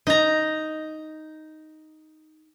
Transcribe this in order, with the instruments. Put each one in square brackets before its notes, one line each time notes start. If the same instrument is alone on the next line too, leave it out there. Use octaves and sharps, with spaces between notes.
[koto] D#4 A#5